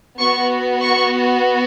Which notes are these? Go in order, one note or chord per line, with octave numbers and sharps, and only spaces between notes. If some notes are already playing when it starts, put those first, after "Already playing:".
B3 F#4 C#6
C#6